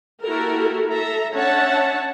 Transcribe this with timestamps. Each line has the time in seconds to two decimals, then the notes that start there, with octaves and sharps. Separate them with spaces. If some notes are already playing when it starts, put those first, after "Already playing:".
0.23 A#3 E4 F#4 G4 A4 A#4
0.89 A4 E5 A#5
1.33 C#4 D4 C#5 E5 F#5 A5